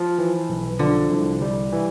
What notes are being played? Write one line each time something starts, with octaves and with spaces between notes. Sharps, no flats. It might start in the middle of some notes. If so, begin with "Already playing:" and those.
Already playing: F3
E3
B1
D3 F3
C2
G3
E3